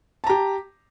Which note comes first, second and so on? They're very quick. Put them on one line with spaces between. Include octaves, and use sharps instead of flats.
A5 A#5 G4